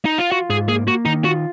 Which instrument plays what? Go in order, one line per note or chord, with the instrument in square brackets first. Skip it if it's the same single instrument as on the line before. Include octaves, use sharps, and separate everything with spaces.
[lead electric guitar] D#4
F4
[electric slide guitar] F4 [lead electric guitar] F#4
[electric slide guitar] G#2 [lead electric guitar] G#4
[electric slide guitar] A#3 [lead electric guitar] G#4
[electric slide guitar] A#3 [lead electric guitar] F#4
[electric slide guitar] D#3 [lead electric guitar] D#4
[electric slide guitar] F4 [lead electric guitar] F#4